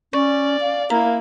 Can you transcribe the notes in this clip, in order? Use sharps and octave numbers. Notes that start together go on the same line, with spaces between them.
C#4 D5 C#6
F5
A#3 E4 F5 A#5